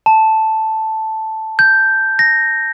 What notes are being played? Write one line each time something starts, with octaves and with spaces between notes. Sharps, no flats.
A5
G6
A#6